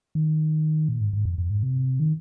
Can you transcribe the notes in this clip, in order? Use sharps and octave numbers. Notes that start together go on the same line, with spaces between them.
D#3
A#2
G#2
G#2
F2
F2
G#2
C3
D#3